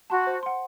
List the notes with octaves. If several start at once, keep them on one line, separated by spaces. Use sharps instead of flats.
F#4 A5 C6
C5
F#5 C6